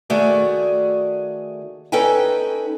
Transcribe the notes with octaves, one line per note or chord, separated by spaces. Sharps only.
D#3 A3 F#4 G#4 D5
C#4 D#4 A4 B4 G5 G#5